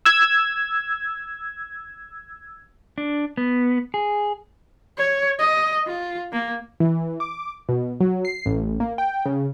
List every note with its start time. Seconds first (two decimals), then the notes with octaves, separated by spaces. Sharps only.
0.05 E6 G#6
2.98 D4
3.37 B3
3.94 G#4
4.98 C#5
5.39 D#5
5.87 F4
6.32 A#3
6.80 E3
7.20 D6
7.69 B2
8.00 F#3
8.25 C7
8.46 A1
8.80 A#3
8.98 G5
9.26 C#3